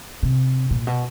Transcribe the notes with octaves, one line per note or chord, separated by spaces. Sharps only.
C3
A#2
B2